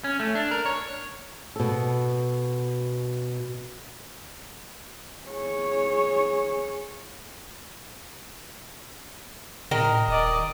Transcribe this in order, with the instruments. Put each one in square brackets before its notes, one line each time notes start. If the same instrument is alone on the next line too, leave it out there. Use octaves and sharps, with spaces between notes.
[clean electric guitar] C#4
A3
D4
A#4
C#5
[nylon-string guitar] B2 A4
[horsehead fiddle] G#4 C#5
[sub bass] A2 [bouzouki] D#3 A#4
[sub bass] D#1 [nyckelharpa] D5 D#5